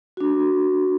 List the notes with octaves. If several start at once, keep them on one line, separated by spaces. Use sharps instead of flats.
D4 F#4